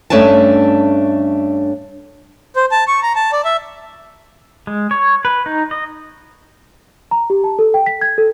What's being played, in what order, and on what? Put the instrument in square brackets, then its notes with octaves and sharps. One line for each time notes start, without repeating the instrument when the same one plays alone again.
[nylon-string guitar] G2 A3 C#4 D4 G#5 A5
[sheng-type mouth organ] C5
A5
C#6
A#5
A5
D5
E5
[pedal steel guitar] G#3
C#5
B4
D#4
D#5
[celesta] A#5
G4
A5
A4
G5
B6
G#6
A4